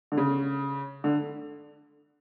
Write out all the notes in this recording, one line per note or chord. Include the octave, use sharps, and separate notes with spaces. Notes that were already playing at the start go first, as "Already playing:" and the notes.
D3
C#3
D3